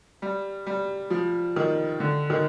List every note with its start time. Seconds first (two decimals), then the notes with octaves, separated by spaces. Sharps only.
0.22 G3
0.67 G3
1.10 F3
1.56 D#3
2.00 D3
2.30 D#3